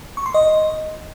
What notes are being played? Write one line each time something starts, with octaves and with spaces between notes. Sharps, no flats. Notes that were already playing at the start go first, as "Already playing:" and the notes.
C#6
C6
D#5